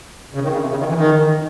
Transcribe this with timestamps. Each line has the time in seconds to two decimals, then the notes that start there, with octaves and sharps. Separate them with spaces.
0.35 C#3
0.43 D#3
0.52 C#3
0.62 C3
0.71 C#3
0.79 D#3
0.89 E3
0.97 D#3